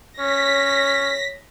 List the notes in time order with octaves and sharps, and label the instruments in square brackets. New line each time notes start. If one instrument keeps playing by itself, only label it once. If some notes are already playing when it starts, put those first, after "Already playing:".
[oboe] C#4 [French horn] C#5 [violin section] A#6 B6